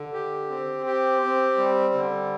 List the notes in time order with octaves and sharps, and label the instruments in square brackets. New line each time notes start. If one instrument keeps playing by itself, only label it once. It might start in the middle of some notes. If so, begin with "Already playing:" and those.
Already playing: [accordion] D3
G4
C4
G4
C4
G3
D3